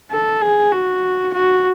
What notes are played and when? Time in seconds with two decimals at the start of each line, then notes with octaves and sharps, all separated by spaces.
0.12 A4
0.42 G#4
0.72 F#4
1.34 F#4